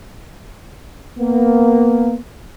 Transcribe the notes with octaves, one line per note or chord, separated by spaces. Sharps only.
A#3 B3